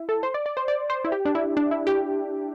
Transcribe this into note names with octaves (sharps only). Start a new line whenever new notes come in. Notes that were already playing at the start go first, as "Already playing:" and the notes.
Already playing: E4
A4
C5
D5
D5
C5
D5
C5
E4
G4
D4
E4
D4
E4
G4